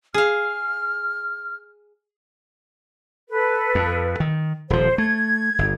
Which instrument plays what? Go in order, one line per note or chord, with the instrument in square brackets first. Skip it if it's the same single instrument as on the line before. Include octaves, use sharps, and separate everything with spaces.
[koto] G#4 F5 [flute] F6
[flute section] A4 B4
[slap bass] F2
D#3
[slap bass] D#1 F3 [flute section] C5
[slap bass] A3 [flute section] G#6
[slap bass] G1